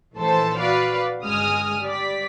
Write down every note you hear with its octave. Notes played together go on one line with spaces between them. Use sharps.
A#1 E3 A3 A4 C5 A5
F#4 B4 D5 F5
G1 C#2 G#3 G#5 D#6 F6
G3 D5 B6